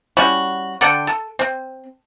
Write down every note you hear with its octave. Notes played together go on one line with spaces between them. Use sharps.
G3 C#4 E4 F#4
D3 A4 F#5 G5
A4
C4